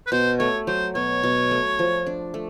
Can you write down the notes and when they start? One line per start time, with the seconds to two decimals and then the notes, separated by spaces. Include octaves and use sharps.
0.06 B4
0.12 B2 C5
0.39 A3 C#5
0.67 F#3 C5
0.95 B2 C#5
1.23 B2
1.51 A3
1.79 F3
2.07 D4
2.34 A3